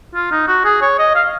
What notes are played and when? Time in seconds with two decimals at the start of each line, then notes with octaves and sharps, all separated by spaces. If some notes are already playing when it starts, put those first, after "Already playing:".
0.15 F4
0.31 D#4
0.48 F#4
0.65 G#4
0.81 C#5
0.99 D#5
1.15 F5